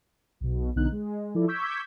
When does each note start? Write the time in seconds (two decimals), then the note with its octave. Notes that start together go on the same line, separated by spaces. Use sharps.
0.40 B1 B2
0.76 B1 D3 B3 D#4 F#6
0.92 G#3
1.35 F3 E4 A4 D5
1.48 C#6 D6 E6 G6 G#6 B6